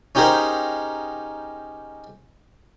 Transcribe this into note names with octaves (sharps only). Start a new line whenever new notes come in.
C#4 D#4 G4 G#4 A#4 C5